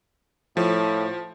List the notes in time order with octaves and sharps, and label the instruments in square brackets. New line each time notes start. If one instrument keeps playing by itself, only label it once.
[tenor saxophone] A2 [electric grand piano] F3